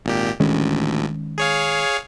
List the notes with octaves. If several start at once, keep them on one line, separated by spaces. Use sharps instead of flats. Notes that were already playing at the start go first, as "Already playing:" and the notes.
G#1 A#2 G4
A1 D2 D#3 G#3 C#4
G#4 C#5 F5